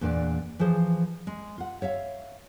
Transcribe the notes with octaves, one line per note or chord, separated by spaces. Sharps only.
E2 A#2 D4 B4 D5
E3 F3 G#4 C5
G#3
F4 F#5
C#5 E5 F5